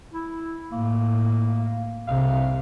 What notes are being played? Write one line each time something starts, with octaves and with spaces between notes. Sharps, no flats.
E4
A2 A#3
C2 C3 F5